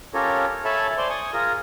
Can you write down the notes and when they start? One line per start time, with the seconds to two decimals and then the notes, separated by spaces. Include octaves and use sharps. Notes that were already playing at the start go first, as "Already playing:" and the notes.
0.14 C#4 F4 G4 A4 A#4 C#5
0.65 A4 C#5 E5 G#5 A5 B5
0.98 C5 D5 G#5 C6
1.10 G#5 C#6 D#6
1.33 F4 G#4 A#4